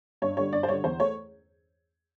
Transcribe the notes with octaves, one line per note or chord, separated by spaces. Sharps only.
G2 C#5
D3 G3 C#5
G2 D5
C5
D3 G3 C#5
E2 C5
A3 C#5